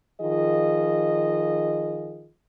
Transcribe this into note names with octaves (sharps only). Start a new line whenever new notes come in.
D#3 F3 F4 G#4 D#5